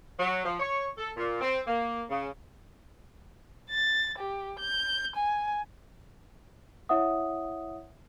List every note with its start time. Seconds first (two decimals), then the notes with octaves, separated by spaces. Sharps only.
0.19 F#3
0.44 F3
0.60 C#5
0.98 A4
1.17 A#2
1.41 C4
1.67 A#3
2.10 C#3
3.70 A6
4.19 G4
4.59 G6
5.16 G#5
6.89 E4 C#5 E5 F#5 D#6